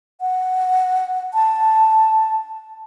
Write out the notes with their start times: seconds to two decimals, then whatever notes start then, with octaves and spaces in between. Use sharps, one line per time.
0.21 F#5
1.34 A5